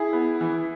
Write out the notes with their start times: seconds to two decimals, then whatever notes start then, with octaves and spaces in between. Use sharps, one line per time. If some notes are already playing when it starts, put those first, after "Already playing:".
Already playing: E4 G#4
0.13 B3
0.41 E3